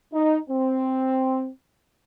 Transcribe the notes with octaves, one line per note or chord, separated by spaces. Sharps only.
D#4
C4